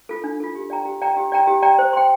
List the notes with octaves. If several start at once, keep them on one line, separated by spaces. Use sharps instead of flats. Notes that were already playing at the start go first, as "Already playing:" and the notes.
F4 A4
D4
F4 A4
G4
D5 G5 A#5
G4
D5 G5 A#5
G4
D5 G5 A#5
G4
D5 G5 A#5
C5
G5 C6